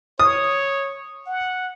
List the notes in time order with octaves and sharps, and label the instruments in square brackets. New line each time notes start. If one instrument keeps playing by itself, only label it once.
[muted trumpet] C#5 [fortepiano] D#6
[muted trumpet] F#5